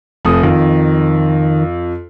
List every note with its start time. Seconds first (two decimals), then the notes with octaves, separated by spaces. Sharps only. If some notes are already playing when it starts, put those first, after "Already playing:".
0.25 F1 A3 D#6
0.43 F2 D#3